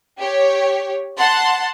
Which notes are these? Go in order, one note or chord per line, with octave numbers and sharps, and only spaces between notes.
G4 C#5
F#5 A5 C6